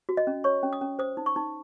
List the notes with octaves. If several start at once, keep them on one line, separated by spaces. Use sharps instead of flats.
F#4
D#5
C#4
C#5 C#6
C#4
D#6
C#4
C5 D#6
D#4
C#6
D#4